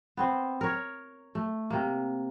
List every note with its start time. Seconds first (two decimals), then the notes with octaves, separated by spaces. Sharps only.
0.17 B3 C4 C5
0.61 A#4 C#5
1.35 A3
1.70 C3 A#3